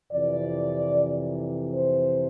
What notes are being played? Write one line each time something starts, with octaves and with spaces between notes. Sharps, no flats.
F2 C3 E3 D5
C5